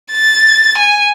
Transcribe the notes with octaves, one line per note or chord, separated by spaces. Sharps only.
A6
G#5